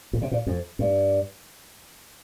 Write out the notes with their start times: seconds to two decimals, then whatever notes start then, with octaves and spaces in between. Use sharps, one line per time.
0.13 A#2
0.22 C3
0.31 A#2
0.47 F2
0.79 G2